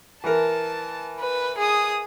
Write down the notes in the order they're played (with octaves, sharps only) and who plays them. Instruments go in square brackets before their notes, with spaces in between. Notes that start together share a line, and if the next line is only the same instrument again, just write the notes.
[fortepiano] E3 A#4 [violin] A5
[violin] B4
G#4 D#6